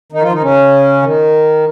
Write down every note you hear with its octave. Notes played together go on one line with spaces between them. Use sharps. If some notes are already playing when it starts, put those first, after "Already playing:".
D#3 D#4
F3 F4
D#3 D#4
C#3 C#4
D#3